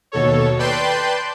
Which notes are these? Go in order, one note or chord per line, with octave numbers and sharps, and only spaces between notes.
D#2 B2 A4 C#5
B4 D5 G5 A5 C6 G6